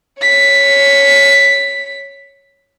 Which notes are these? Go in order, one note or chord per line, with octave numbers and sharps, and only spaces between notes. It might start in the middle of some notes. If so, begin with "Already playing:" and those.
C#5 B6